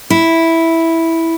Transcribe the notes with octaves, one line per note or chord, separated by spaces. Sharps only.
E4